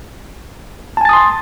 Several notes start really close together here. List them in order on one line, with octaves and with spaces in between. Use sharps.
A5 G#5 A6 D#6 C6